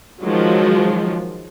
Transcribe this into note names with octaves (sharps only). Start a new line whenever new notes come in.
D#3 F3 F#3 G#3